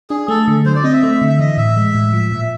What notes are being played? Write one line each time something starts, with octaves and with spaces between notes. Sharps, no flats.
D4 G#4
A3 A4
D3
F#3 C5
D5
C4 D#5
E5
A3
D3
E5
E3 D#5
A2 E5
G#3
A2
F3
A#2